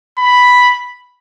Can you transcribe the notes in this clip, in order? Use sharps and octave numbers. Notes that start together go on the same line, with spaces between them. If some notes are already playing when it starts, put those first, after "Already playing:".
B5